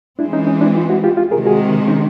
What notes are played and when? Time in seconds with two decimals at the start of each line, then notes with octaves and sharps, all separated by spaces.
0.19 E3 G#3 C4 D4 E4
0.33 C#4 D#4
0.47 C#4 D#4
0.61 D4 E4
0.75 D#4 F4
0.90 E4 F#4
1.04 F4 G4
1.17 F4 G4
1.31 C3 D#3 G#3 G#4 A#4
1.46 F#4 G#4
1.88 C#4 D#4